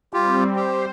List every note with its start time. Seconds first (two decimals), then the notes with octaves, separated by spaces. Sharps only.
0.13 G3 C4 F4 G4
0.56 G4 C5